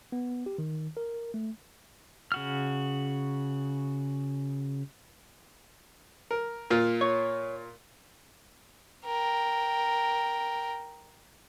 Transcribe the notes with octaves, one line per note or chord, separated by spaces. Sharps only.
B3
G4
D#3
A#4
A3
C#3 F#4 F6
A#4
A#2 F4
C#5
A#4 G5